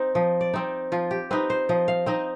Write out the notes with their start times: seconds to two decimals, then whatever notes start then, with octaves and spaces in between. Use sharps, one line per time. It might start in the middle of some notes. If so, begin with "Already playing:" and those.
Already playing: C4 D#4
0.15 F3 D#5
0.41 D5
0.54 C4 D#4
0.92 F3 F4
1.11 G4
1.31 C4 D#4 B4
1.50 C5
1.69 F3 D#5
1.88 F5
2.06 C4 D#4 D#5